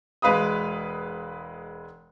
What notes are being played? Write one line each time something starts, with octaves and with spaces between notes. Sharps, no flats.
E1 G#3 B4 F5 B5 D#6